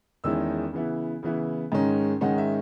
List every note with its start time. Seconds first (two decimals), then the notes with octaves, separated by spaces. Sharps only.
0.24 E2 D#3 G#3 C#4 E4 E6
0.73 C#3 E3 B3 E4
1.23 C#3 E3 B3 E4
1.72 G#2 D#3 G#3 C#4
2.21 G#2 D#3 G#3 C#4 F#5
2.38 E5